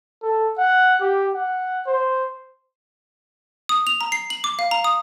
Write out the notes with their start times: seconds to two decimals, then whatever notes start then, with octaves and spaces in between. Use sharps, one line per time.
0.23 A4
0.58 F#5
1.01 G4
1.35 F#5
1.87 C5
3.69 D#6
3.87 F7
4.01 A#5
4.12 C7
4.30 F#7
4.44 D6
4.59 F5
4.71 A#5
4.84 D#6